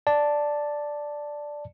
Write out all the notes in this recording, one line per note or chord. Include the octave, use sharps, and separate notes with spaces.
D5 A5